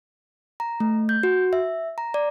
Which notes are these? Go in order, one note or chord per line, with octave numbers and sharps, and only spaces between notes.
A#5
A3
G6
F#4
E5
A#5
D5